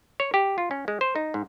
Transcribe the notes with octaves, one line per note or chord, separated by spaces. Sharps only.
C#5
G4
F4
C#4
G#3
C5
D#4
G#2